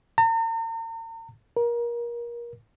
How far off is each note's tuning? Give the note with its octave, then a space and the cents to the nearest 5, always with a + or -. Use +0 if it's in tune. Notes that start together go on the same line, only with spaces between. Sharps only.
A#5 -45
A#4 +25